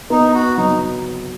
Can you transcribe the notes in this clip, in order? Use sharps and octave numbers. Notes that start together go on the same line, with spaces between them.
B3 D#4
F#4
F#3 D#4